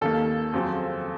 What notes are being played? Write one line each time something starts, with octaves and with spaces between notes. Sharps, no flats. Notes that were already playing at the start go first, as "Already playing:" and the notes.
D#2 D#3 A#3 A4
F2 C#3 F#3 C4